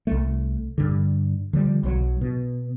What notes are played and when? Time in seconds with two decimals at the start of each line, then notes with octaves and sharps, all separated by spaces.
0.07 C2 A3
0.78 G2 D3
1.53 D3 F3 G3
1.83 B1 F#3
2.21 B2